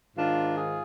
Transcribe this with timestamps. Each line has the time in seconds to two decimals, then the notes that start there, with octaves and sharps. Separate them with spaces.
0.17 G#2 D#3 D4 F4
0.57 F4 G#4